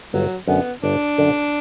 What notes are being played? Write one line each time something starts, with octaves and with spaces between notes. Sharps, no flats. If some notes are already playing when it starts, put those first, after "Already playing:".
G1 F#3
F#2 D3 B3
G1 D4
F#2 D3